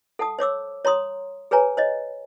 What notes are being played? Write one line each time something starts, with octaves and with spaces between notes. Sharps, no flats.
A4 F#5 A5 D#6
C5 C#5 D6 E6
C#5 A#5 C6 D#6
G#4 B4 C#5 G#5 A#5
C5 C#5 D#5